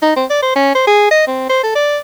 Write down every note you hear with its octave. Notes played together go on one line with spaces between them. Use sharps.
D#4
C4
D5
C5
C#4
C5
G#4
D#5
C4
C5
A4
D5